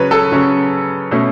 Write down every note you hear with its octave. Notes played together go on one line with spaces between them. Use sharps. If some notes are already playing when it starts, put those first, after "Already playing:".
Already playing: C#3 F#3 C#4 B4 C#5
A4
C#3 F#3 C#4
B2 A3 C#4